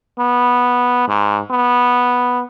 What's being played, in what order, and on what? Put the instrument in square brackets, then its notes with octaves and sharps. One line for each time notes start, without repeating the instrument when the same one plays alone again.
[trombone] B3
G#2
B3